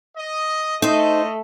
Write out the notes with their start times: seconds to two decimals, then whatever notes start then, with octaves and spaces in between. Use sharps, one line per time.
0.17 D#5
0.82 A3 D#4 A4 C5 D#5